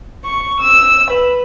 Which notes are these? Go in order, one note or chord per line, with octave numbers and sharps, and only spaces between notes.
C#6
E6
B4